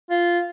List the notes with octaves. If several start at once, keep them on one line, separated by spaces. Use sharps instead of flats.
F4